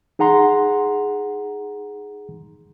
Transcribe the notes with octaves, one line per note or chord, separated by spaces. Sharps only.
D#4 G#4 F#5 A#5 C6